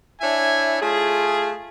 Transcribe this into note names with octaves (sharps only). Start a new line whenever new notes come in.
D4 E4 C#5 E5 G#5
A3 F4 G#4